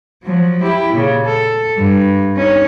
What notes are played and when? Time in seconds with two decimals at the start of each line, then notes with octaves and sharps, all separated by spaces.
0.24 F3 F#3
0.62 E4 G4
0.93 A#2 C#3
1.26 A4
1.78 G2
2.37 C#4 D#4